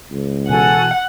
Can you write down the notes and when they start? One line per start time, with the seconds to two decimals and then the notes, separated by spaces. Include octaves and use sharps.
0.11 C#2
0.49 B2 E3 F#4 A4 F#5 G#5